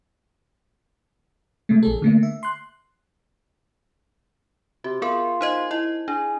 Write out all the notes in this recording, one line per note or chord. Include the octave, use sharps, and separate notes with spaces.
C3 G#3 A3
A#1 G#4 A4
D3 A3 A#3
E5
C6 F#6
C3 F#4
B3 F4 G#4 A#4
D#4 C5 D#5
E4 D#5
D4 G#4